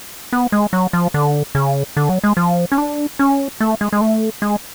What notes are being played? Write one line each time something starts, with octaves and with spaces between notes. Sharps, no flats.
B3
G#3
F#3
F3
D3
C#3
D3
F#3
G#3
F3
C#4
D4
C#4
A3
G#3
G#3
A3
G#3